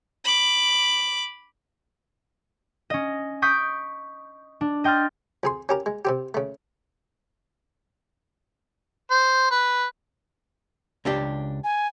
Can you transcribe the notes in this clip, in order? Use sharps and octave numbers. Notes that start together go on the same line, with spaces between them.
B5 D6
C#4 D#5
C#6 D#6 G6 B6 D7
D4
D#5 G5 C6 F6 A6
F2 G#4 C6
C#4 G4 A#4
G#3
C3 C4 G4
C#3 A3
C5
B4
C#2 D4 G4
G#5